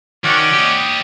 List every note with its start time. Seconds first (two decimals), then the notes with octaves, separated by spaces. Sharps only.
0.24 D#3 C#4 F#4 D5
0.54 G4 D#5